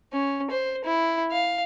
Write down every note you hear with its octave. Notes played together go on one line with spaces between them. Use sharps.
C#4
C5
E4
F5